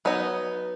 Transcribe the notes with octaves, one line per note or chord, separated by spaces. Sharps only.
F#3 B3 D#4